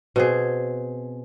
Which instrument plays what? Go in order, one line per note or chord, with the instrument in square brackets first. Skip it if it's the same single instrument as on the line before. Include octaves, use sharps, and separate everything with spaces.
[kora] B2 C4 G#4